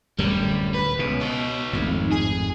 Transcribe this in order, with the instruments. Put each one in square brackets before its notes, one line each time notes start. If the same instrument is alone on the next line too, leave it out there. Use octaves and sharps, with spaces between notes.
[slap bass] D1 F#2 D3 [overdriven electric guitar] G3
[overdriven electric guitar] B4
[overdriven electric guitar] C#2 [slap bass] B2
[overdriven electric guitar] D#4 C#5
[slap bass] G#1 F2 A2
[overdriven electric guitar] G#4